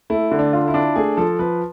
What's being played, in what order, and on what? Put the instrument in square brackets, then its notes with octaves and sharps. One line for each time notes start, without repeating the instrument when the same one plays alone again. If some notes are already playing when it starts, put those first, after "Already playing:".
[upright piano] A3 [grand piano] E4
[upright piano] D3
[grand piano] D4
[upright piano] F4
[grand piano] E4
[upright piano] D4
[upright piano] A3 [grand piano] G#4
[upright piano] F3 [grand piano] A4
[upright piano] F3 [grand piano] B4